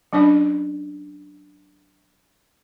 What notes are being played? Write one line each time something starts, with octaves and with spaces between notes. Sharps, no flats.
F#3 C#4 D4 D5